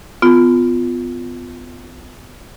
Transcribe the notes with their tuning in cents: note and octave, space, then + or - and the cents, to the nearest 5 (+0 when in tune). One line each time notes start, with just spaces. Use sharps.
B3 +30 F4 +0